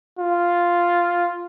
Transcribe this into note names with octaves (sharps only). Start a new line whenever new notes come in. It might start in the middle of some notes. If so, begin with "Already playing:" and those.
F4